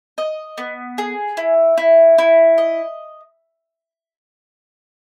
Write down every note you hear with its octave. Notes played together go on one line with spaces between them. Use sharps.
D#5
B3
G#4
E4
E4
E4
D#5